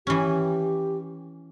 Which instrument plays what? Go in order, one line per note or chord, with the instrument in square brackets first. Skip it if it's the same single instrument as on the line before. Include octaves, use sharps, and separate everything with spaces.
[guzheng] E3 C#4 [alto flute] G4